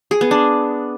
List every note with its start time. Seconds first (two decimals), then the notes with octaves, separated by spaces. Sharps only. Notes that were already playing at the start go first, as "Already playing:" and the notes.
0.11 G#4
0.21 B3
0.31 D4